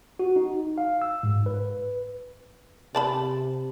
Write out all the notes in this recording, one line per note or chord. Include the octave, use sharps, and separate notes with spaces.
F#4
D#4
F5
E6
G#2
B4
C3 D5 A5 B5